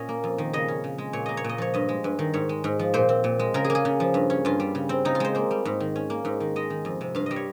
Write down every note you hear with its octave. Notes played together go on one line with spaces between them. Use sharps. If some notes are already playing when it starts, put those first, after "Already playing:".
Already playing: A#2 C#4 D#5 F5
A#3
F2
D#3
C#3 D#5
C#4
C#3
G#3
A#2 C#5
A#3 D#5
C#5
A#2 D#5
F3 C#5
G2 D#5
G#3
G2
D#3
G#2 C#5
G#3
G#2
F3
A#2 C5
C4
A#2
G#3
C#3 A#4
G#4
A#3
G#4
C#3
F3
G2
C#4
G2 F4
G3
C#3
C4
C#3 D#4
F4
G#3 C5
A#3 C5
G3
G#2
D#3
C#4
A#3
G#2
D#3
G#3 D#5
D#3
F2
C3
G2 F5
G3 D#5
C#5